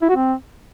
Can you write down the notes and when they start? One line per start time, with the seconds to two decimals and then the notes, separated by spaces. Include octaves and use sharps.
0.02 E4
0.09 F#4
0.16 C4